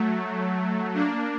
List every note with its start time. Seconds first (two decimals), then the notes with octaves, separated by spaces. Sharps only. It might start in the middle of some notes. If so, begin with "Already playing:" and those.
Already playing: F#3 A3
0.94 A#3 D4